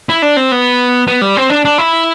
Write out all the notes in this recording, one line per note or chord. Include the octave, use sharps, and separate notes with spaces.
E4
D4
C4
B3
B3
G3
C4
D4
D4
E4